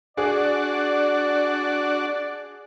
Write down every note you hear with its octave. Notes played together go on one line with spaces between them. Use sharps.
D4 F#4 G#4 D5